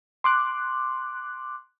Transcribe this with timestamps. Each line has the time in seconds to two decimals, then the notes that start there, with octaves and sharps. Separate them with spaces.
0.24 C6 D6 F#6